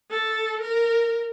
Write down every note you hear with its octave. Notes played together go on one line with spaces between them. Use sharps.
A4
A#4